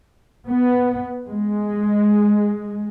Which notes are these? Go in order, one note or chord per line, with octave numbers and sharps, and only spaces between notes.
B3
G#3